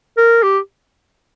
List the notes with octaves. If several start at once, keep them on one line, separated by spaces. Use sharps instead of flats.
A#4
G4